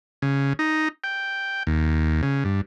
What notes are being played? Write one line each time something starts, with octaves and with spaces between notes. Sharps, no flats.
C#3
D#4
G5
D#2
C#3
G2